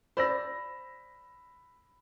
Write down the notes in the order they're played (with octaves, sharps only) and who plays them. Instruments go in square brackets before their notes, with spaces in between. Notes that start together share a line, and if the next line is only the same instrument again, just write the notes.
[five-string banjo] C5 D5 [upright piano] B5 E6 A#6